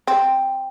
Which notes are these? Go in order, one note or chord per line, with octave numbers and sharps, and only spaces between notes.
C4